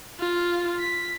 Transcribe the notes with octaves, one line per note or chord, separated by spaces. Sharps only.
F4
B6